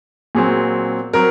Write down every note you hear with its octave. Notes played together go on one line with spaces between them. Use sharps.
A#2 F#3 C4 G#4
F#3 C4 A#4